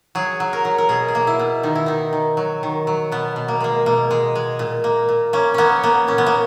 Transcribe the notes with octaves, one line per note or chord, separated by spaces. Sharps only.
F#3 G#4
F#3
A#4
F#3
A#4
B2 G#4
G#4
A#3
E4
B2
D#3 D#4
E4
D#3 D#4
D#3
F#3
D#3
F#3
B2 B3
B2
A#3
G#3 A#3
B2 A#3
G#3
G#3
A#2
A#3
A#2
A#3 C#4
A#3 B3 C#4
A#3 B3
A#2 C#4
B3
A#3